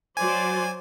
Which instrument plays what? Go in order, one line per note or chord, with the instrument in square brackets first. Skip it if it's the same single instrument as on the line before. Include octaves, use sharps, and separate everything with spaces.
[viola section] F#3 C5 D5 [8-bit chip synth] G#5